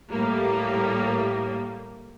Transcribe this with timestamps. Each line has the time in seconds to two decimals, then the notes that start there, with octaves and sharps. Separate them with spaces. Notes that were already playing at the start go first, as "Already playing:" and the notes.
0.12 A2 G3 A#3